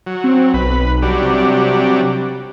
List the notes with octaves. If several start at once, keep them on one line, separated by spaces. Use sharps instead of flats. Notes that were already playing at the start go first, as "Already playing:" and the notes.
F#3
C4
B1 B4
F#3 G3 D4
C3